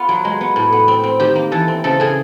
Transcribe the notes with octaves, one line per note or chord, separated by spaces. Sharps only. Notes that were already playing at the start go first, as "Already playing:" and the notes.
Already playing: B3 F4
F#3
G#3
B3
A2
B3
C4
C4
D#3 G4
A#3
E3 A4
C4
C#3 A4
C#3 G#4